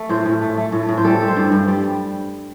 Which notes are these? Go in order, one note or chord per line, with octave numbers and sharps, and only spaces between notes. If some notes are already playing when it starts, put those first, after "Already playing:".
Already playing: A3
A2 C5
A2
A3
A3
A2
A2
C5
G3 A4
G3
C5
G2
G2
G3